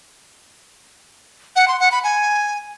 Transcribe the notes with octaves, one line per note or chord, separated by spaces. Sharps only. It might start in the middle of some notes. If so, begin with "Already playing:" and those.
F#5
C6
F#5
B5
G#5